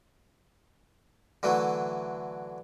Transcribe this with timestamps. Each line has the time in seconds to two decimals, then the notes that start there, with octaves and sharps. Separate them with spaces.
1.43 D3 E3 F#3 A3